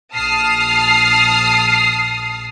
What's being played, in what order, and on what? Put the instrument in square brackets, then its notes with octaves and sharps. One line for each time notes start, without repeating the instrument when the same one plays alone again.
[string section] A#1 A5 D#6 F6 C7